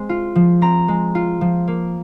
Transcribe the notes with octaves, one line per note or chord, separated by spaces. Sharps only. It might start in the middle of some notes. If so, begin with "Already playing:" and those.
Already playing: G#3 C4 C6
F4
F3
C4 A#5
G#3
F4
F3
A#3